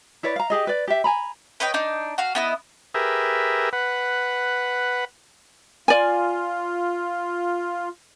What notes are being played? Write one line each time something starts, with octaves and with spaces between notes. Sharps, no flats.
E4 B4 C#5 D5
F5 A#5
G4 G#4 D#5
B4 D5
G4 E5
G#5 A#5 B5
B4 C#5 D#5 G5
D4 D#4
F#4 F5
B3 E4 D#5
G4 G#4 A#4 B4 E5
B4 F#5
F4 D5 G#5